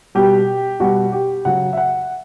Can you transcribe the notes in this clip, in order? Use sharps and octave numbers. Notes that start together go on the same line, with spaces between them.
B2 G3 G4
B2 G3 F#4
G4
C#3 F#3 F#5
E5
F#5